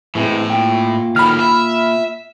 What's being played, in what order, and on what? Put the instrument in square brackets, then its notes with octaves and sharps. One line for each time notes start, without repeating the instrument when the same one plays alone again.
[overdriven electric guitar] A2 [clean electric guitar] E3 G#3 C4
[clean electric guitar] A#2 G5
[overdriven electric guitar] A2 D#3 [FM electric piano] B5 F6
[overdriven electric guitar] E5